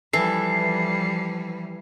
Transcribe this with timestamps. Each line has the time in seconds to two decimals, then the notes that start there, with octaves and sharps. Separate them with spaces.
0.13 E3 F3 G3 A4 C7